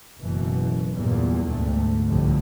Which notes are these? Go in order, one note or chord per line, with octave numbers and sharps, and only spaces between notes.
F#1 B2 E3
E2 G2 A#2
D2 G#2 A3
C2 F2 A2 D3